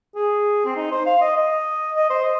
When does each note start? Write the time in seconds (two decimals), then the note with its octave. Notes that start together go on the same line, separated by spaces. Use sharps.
0.15 G#4
0.66 C4
0.76 D#4
0.91 C5
1.06 F5
1.21 D#5
1.36 D#5
1.96 D#5
2.10 C5
2.24 D#5